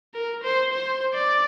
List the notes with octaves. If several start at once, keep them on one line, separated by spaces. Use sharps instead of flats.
A#4
C5
C5
D5